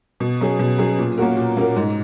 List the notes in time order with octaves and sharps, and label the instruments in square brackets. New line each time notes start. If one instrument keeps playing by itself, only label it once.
[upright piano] B2
F#3 C#4 G#4
B2
F#3 C#4 G#4
A#2
A#3 C#4 F#4 A#4
A#2
A#3 C#4 F#4 A#4
G#2